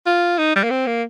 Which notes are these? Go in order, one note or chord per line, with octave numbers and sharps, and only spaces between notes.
F4
D#4
G3
A#3
C4
A#3